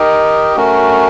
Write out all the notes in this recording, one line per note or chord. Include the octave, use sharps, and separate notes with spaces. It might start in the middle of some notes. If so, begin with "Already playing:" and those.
Already playing: D#4 G4 A#4 D#5 G5
A3 C#4 F#4 A#4